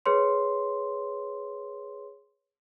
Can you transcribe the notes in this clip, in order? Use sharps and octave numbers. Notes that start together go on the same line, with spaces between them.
G#4 B4 C#5 C6